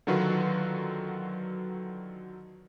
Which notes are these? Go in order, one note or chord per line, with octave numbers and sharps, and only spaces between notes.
D3 D#3 F#3 F4 F#4 B4